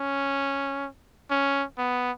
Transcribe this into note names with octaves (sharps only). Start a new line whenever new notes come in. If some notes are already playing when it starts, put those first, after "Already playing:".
Already playing: C#4
C#4
B3